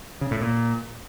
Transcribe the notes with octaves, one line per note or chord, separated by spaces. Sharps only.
C#3
A2
A#2